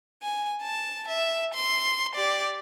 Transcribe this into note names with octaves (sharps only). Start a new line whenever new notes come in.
G#5
A5
E5
C6
G4 D5